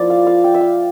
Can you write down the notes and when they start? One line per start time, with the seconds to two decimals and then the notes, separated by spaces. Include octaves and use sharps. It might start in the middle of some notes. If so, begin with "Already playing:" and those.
Already playing: F3 A#3 E4 D5
0.10 F5
0.27 F5
0.44 G5
0.54 E5
0.61 F5